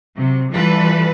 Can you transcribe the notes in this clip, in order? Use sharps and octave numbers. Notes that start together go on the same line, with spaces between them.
C3 F#3
E3 G3 F4 A4 B4